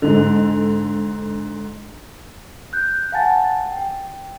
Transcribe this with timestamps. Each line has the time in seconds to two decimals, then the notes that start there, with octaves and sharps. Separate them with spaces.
0.02 G#2 D3
2.73 F#6 G6
3.12 F5 F#5 G#5 A5 A6
3.72 G5